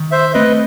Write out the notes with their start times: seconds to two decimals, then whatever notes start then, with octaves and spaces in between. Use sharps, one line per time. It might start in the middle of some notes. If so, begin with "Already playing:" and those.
Already playing: D#3
0.11 C5 E5
0.34 A3 C4 B4 D#5